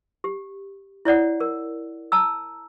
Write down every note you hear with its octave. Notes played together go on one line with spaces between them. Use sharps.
G4
E4 C#5 D5 F#5
A#4
A5 A#5 E6